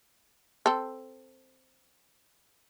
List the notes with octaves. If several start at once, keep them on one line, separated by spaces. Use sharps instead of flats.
C4 A4